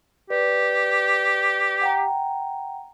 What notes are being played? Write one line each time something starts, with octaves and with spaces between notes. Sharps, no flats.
G4 B4 D5
F#5 G5 A#5